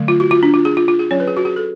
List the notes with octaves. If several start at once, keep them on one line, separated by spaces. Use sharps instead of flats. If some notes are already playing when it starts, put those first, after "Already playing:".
Already playing: D3 F#3 A3
F4
F#4
F4
D4
F4
G#4
F4
F4
G#4
F#3 C#4 C#5
B4
G#4
F#4
G#4
A4